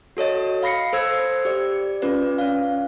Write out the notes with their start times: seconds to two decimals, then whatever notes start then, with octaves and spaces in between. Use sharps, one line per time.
0.17 F#4 A4 C#5 D#5
0.63 F5 B5 A#6 C7 C#7
0.93 A4 C5 E6 G#6
1.45 G4 D5
2.02 C#4 F4 B4 D5
2.38 C#4 F5